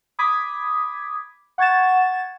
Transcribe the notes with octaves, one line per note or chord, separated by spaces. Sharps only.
B5 D6 D#6 G#6 B6
F#5 C#6 G#6 A6 E7